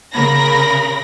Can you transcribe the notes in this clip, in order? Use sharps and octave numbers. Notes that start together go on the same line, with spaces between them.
C#3 A#4 B5 A#6